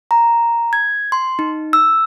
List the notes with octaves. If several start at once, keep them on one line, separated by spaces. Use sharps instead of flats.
A#5
G#6
C6
D#4
E6